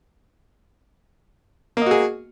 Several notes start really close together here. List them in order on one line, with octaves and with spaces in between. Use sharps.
A#3 D#5 F#4 G#4